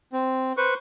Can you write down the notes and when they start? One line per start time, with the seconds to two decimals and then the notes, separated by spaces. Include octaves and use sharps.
0.13 C4
0.57 B4 C5 C#6